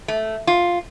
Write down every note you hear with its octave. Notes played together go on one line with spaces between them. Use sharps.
A3
F4